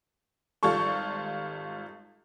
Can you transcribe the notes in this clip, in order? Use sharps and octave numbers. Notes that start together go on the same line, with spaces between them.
G#1 G3 F4 A4 C#6